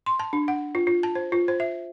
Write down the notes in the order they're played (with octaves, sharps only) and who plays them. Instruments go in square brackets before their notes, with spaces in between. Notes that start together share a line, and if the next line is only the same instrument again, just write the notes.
[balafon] C6
A5
D4
F#5
F4
F4
A5
C5
F4
C5
E5